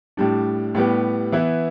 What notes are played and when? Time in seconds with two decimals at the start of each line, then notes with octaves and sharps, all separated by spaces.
0.17 A2 G3 D4
0.75 A2 G3 B3 G4
1.32 E3 B3 E4